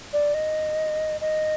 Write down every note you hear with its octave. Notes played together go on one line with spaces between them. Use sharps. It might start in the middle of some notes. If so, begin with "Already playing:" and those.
D5
D#5
D#5